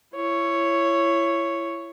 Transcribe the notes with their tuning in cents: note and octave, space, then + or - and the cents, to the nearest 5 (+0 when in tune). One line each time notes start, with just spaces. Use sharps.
E4 +30 C#5 +0